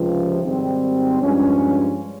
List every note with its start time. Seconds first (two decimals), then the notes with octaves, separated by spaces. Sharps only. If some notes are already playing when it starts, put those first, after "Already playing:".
Already playing: C#2 C3 F3
0.43 G#1 G#2 G3 C4
1.21 G2 F3 G#3 C#4